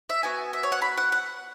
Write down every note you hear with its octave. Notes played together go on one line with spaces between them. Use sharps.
E5
B3 F#4 G#5
E5
C#5
F#5
B5
F#5
F#5